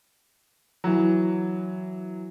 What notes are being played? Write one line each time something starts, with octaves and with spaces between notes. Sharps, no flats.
E3 F#3